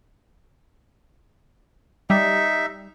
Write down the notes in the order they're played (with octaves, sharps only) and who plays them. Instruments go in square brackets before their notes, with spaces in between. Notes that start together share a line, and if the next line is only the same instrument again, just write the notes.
[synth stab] G3 [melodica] D#4 E5